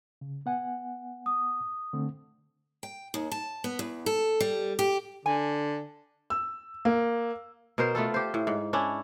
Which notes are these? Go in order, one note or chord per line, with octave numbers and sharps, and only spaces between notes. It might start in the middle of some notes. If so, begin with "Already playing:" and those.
C#3
B3 F#5 G#5
D#6
D3 A3 C4
G5
D#2
A5
B3
E2
A4
G3
G4
D3 G#5
E6
A#3
B2 A#4 C5
A3 B3 F4 A4
G4 C5
A2
G#2
C#4 D4 E4